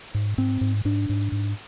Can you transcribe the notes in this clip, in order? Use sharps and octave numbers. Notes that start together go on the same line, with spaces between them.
G#2
G#2 C4
G#2
G#2 D4
G#2
G#2